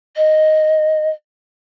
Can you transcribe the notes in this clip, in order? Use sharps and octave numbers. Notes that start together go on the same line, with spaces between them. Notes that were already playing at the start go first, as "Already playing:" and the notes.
D#5